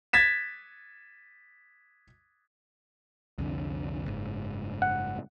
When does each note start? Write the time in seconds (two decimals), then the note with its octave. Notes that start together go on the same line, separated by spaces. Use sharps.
0.13 G#6 A6 B6 E7
3.38 C2 F2 D3
4.06 F#1 G#2
4.82 F#5